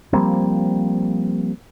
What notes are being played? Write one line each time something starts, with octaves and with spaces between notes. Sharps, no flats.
F3 G3 A#3 C4